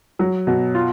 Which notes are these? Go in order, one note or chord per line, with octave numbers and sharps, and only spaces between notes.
F#3
B2
F4